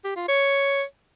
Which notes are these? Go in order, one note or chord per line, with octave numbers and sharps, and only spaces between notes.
G4
F4
C#5